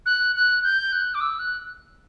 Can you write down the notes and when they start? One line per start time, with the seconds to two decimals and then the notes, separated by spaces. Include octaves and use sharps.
0.06 F#6
0.36 F#6
0.63 G6
0.92 F#6
1.14 D6
1.21 E6
1.39 F#6